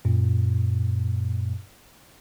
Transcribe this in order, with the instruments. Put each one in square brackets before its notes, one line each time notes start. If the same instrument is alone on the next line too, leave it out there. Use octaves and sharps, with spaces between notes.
[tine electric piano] F#2 A#2